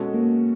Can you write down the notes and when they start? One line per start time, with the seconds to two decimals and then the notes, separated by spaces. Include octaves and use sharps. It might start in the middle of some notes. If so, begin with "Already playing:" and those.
Already playing: B2 G#3 C#4 F#4 A4
0.14 A#3